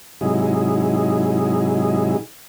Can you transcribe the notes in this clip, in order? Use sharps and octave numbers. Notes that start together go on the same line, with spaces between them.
G#2 C3 F#3 D#4 E4 G#4